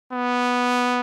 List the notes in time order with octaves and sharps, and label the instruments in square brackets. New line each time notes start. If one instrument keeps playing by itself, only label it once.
[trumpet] B3